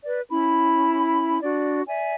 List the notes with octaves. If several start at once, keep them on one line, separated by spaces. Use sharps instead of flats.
B4 D5
C#4 E4 B5
D4 F#4 D5
D5 E5 G#5